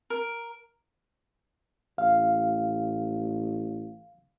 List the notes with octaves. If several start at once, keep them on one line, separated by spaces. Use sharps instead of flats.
A#4
A1 F5